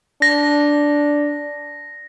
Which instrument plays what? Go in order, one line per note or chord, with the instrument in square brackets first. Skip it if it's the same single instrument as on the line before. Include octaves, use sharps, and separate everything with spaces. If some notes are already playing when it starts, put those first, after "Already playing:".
[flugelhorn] D4 [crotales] A#6